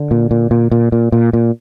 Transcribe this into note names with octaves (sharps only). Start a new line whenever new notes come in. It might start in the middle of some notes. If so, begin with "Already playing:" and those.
Already playing: D3
A#2
A#2
A#2
A#2
A#2
A#2
A#2